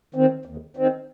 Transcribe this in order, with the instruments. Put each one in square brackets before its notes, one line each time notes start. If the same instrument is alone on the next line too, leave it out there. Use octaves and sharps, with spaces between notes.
[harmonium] D#3 C4
D#2
D#3 C4